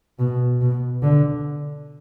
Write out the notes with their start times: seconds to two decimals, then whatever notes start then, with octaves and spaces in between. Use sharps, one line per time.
0.19 B2
0.61 B2
1.03 D3